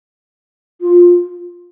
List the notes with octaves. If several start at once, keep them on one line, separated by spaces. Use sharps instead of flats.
F4